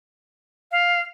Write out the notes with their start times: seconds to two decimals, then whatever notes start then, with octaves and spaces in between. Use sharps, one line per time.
0.72 F5